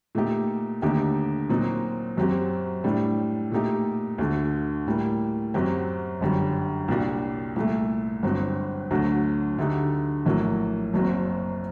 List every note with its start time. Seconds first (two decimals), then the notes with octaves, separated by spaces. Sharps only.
0.15 A#2 A3 D#4 G4
0.82 D#2 D3 A3 D#4 G4
1.49 A#2 F#3 C4 D#4 F#4
2.17 F#2 F#3 C4 G4
2.84 A2 G3 D4
3.52 A#2 A3 D#4 G4
4.18 D2 D3 A3
4.87 A2 G3 A#3
5.54 F#2 F#3 C4 G4
6.21 G1 F#2 D3 G3
6.88 C2 A#2 G3 D4 F#4
7.56 C2 A#2 A3
8.23 G1 G2 F#3 C4
8.91 D2 D3 F#3
9.58 D2 D3 A3 D#4 G4
10.26 A#1 A2 F#3 A#3
10.93 F#1 F#2 F#3 C4